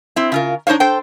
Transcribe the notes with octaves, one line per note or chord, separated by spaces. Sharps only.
C4 E4
C#3 F4 A#4
D4 D#4 C5 C#5 F5
A4 C5 G5